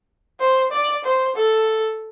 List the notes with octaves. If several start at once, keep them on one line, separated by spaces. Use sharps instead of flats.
C5
D5
C5
A4